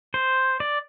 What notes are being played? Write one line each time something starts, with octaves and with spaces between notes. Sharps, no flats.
C5
D5